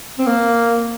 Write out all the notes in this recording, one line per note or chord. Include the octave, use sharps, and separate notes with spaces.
C4
A#3